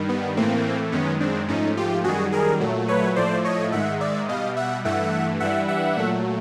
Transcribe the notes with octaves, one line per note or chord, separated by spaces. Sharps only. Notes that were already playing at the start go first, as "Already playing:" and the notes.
Already playing: G2 D#3 G3
B3
A2 E3 A3 A#3 C4
F#2 D#3 G#3 B3 C#4
C4 D4
G#2 F3 A3 C#4 D#4
F4 G4
F#2 D#3 G3 F#4 G#4
G#4 A#4
A#2 F#3 A3
B4 C#5
A2 F3 A3 C5 D5
C#5 D#5
G#2 D#3 G#3 E5 F#5
D5 E5
B2 G3 D#5 F5
E5 F#5
G2 E3 A3 E5 F#5
G2 E3 G3 E5 F#5
E5 F#5
A#2 F#3 A3